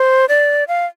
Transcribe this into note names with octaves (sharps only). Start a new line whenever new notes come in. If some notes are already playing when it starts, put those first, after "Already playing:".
Already playing: C5
D5
F5